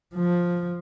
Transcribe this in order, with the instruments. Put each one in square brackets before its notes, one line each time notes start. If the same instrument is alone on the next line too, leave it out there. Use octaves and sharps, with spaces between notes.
[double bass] F3